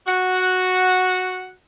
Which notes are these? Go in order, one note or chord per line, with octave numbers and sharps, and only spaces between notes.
F#4 F#5